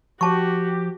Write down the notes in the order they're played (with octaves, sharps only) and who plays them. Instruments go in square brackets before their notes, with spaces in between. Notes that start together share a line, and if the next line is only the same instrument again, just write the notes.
[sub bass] F3 [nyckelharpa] F#4 [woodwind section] G4 [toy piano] A5 C#6